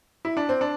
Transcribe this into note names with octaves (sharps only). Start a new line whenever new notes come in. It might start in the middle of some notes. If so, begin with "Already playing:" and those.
E4
D4
C4
D4